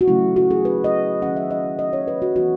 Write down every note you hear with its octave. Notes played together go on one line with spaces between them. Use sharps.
F#4
C#3 F#3 A3 C#4 E4
F#4
G#4
B4
D#5
D#3 F#3 C#4 F#5
E5
D#5
D#5
C#5
B4
F#4
E3 G#3 B3 F#4